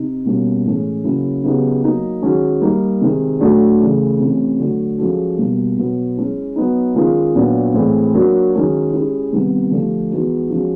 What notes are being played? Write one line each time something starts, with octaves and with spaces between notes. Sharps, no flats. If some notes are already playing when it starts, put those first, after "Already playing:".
Already playing: C3 D#4
B2 G3 A#3 C#4
A2 E3 G#3 C#4
C#3 F#3 A#3 C#4 E4
C#3 F#3 B3 D#4 G4
F#3 A#3 D#4
D#3 G#3 C#4 F#4
G3 A#3 D#4
C3 D#3 G#3 C4
A2 F#3 A3 D4 F#4
C#3 E3 A3
C3 E3 A3 C#4
D3 F#3 A3 D4 F#4
F3 G#3 C#4 F#4 A4
B2 G3 A#3
B2 F#3 B3
G#3 C#4 E4
F#3 B3 D#4
D#3 G#3 C#4 F4 A#4
A#2 F#3 B3 D4
A2 E3 G#3 C4
F#3 A#3 D4 F#4 A#4
D#3 G#3 C#4 F#4
G#3 C#4 E4 G4
C3 D#3 G3 B3
D3 F3 A3 D4 G4
E3 G#3 B3 D#4 F#4
F3 G#3 C#4 F#4